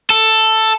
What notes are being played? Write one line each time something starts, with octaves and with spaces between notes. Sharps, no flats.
A4